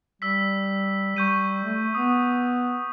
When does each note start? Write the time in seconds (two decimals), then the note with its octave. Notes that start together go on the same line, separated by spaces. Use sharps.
0.22 G3 E6 B6
1.16 G3 C#6 G6 D#7
1.64 A3
1.95 B3 D#6